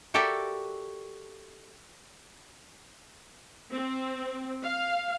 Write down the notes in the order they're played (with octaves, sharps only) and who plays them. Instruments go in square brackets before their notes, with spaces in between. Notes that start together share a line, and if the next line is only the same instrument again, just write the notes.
[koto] F#4 G4 A4 A#4 D5 E5
[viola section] C4
F5